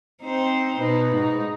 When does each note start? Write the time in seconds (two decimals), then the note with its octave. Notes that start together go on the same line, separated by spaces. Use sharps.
0.24 C4 D#4 C5
0.80 B2 D#4 B4
1.15 G#2 D#4